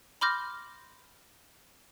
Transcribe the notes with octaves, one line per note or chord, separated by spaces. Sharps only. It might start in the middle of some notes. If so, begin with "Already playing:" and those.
B5 C6 D6 F6 G6 A#6